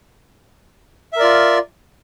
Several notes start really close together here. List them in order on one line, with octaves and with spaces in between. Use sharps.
E5 A#4 D5 F4